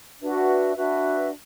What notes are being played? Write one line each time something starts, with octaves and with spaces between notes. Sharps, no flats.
D4 F#4 B4 E5
D4 F#4 B4 E5